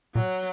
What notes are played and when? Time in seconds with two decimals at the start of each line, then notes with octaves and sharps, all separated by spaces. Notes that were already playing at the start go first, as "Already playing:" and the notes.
0.15 A#2 F#3